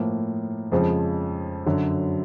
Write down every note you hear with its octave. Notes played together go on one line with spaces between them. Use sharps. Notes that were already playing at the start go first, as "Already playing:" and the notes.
Already playing: A2 F3 A#3
F2 C#3 F3 G#3
F#2 D3 F#3